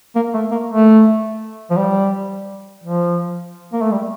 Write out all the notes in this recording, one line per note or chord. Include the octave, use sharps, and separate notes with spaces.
A#3
A3
A#3
A3
F3
G3
F3
A#3
A3
G3